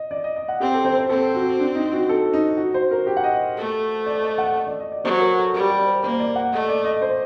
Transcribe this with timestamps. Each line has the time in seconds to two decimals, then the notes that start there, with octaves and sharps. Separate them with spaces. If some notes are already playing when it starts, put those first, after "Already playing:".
Already playing: D#5
0.11 D5
0.24 D#5
0.36 D#5
0.48 F#5
0.60 C4 G4
0.74 A4
0.85 C5
0.98 C5
1.09 C4 A4
1.35 F#4
1.60 D4
1.75 D#4
1.92 F#4
2.09 A4
2.33 D#4
2.57 F#4
2.74 C5
2.91 A#4
3.07 G4
3.17 F#5
3.24 D#5
3.57 A3
4.06 D5
4.22 D#5
4.38 F#5
4.56 D#5
4.67 D5
4.80 D#5
4.92 D5
5.04 F#3 C5
5.20 A#4
5.37 A4
5.54 G3 A#4
5.70 D5
5.81 D5
5.86 C5
6.03 A#3 C5
6.20 D5
6.36 F#5
6.52 A3 D#5
6.68 D5
6.85 D#5
7.02 C5